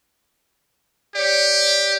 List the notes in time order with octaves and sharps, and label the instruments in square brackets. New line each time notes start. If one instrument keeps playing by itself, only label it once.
[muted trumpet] G4 [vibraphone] C#5 D5